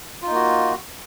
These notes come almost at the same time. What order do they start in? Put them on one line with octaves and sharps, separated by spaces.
F4 D#4 A#3 F#4